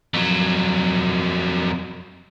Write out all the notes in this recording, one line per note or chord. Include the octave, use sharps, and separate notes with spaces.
F2 F#3